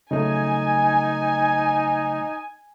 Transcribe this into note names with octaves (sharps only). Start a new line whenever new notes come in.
C#3 F#3 A3 D#4 G#5